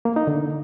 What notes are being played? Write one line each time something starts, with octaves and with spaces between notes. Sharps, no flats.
A#3
D#4
D3